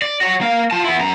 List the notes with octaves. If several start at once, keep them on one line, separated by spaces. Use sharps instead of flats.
D5
F#4 C#5
A#3 F5
F4 A5
B3 E4
F#2 A#5